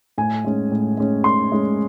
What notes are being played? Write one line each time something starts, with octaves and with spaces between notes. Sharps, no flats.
A2 G#5
G#3 C#4
A2
G#3 C#4
A2 C6
G#3 C#4